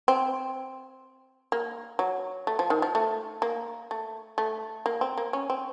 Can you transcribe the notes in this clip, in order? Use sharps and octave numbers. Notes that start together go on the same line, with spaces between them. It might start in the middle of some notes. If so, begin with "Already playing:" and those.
C4
A#3
F#3
A3
F3
D#3
F3
A3
A#3
A3
A3
A#3
C4
A#3
C#4
C4